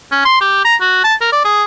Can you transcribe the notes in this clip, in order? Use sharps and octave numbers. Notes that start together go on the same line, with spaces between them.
C#4
C6
G4
A#5
F#4
A5
A#4
D5
G#4